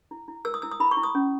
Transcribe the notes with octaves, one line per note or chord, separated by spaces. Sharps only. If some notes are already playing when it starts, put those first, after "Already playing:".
E4
E4
A#4 E6
D#6
E4 E6
D#6
E4 B5
C#6
E4
D#6
C#4